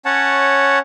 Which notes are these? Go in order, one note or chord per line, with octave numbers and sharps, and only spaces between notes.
C#4 C#5 F#5 A5